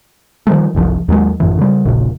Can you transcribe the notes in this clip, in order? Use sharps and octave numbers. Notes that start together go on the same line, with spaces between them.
D#3 F3 G3 A3
F#1 C2 F3
D#2 F#3 G#3
A1 F#2 C#3 E3
C#3 G3
D#1 A#1 C#3